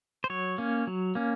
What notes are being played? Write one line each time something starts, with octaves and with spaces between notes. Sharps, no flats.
C5
F#3 C#5
A#3 C#4
F#3
A#3 C#4